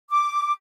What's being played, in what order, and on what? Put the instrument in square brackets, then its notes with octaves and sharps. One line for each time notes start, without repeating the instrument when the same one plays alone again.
[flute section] D6